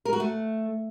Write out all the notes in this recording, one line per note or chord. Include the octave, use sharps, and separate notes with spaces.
A#4
F#4
A3